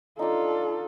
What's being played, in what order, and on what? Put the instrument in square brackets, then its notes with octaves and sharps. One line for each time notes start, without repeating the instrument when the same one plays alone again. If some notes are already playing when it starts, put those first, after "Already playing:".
[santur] D4 D#4 [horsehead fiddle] F4 A4